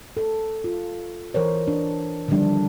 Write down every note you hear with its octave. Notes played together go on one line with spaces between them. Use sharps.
A4
F4
E3 A#4 C5 C#5
D4
D3 D#3 F3 G3 D4